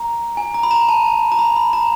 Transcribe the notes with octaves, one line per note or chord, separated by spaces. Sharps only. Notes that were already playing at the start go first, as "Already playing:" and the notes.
Already playing: A#5
G#5
A#5
B5
A#5
A5
A#5
B5
B5
A#5